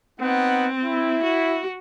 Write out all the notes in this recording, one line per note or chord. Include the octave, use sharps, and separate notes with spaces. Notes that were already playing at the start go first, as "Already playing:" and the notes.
B3 C4 D#4 F#5
E4
F#4